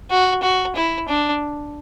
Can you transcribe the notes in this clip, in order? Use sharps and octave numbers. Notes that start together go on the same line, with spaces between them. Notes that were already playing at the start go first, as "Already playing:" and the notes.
F#4
F#4
E4
D4